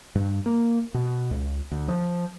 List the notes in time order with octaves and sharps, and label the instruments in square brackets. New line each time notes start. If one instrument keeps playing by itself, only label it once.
[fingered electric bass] G2
A#3
B2
C#2
D2
F3